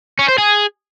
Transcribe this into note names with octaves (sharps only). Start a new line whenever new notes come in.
C#4
C5
G#4